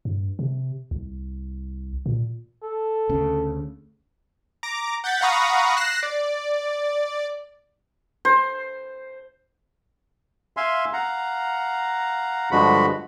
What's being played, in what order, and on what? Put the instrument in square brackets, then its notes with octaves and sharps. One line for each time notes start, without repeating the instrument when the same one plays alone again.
[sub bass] G2
C3
C2
A#2
[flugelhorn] A4
[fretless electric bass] D2 C#3
[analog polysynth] A#5 D6
F#5 G6 A6 B6
F5 F#5 A#5 B5 C#6 D#6
F#6 A#6 C7 E7
D5
[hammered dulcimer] C5
[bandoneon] E5 F5 G#5 C6
F5 F#5 A#5
G2 D3 F3 G#3 F#4 B5